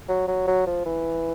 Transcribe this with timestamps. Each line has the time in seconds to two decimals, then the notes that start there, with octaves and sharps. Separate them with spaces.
0.08 F#3
0.28 F#3
0.47 F#3
0.66 F3
0.86 E3